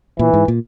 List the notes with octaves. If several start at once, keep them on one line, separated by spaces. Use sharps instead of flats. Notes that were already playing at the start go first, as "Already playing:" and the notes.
A#2 E3
G#2
A#2